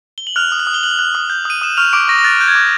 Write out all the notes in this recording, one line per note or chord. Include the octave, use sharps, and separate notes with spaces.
G7
F#7
F6 F#6 F7
D#6
F#6 F#7
D#6
G7
F#6 F#7
F#6
D#6
G6
D#6 D#7
D#6 E7
C#6 F6 F7
C#6 D6 D7
C#6 A#6
A#6
F#6 A6
F#6 G6
G#6
D6